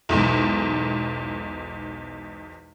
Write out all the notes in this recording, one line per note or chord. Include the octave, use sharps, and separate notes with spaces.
B1 E2 G#2